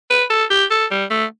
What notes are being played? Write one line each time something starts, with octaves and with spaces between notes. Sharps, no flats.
B4
A4
G4
A4
G3
A3